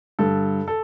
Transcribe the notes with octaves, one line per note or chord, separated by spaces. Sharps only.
G2 D3 A4
A4